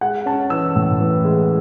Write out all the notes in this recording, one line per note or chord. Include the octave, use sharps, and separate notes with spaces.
G#3 F#5
C#4 A5
E3 E6
A2
E3
G#3